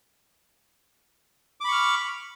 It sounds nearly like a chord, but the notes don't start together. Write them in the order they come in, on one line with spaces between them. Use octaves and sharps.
D6 B5 C#6 F6